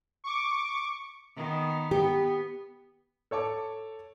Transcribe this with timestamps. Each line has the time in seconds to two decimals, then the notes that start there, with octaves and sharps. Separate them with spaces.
0.24 C#6 D6
1.36 D#3 B3
1.91 B3 G4
3.31 A4 C#5 A5 D6